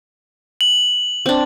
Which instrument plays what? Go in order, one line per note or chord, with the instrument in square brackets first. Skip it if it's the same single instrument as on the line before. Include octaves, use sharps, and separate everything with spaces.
[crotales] F#7
[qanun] C4 D4